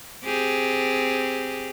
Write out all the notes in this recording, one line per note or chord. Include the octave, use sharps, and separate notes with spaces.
C4 G4 G#4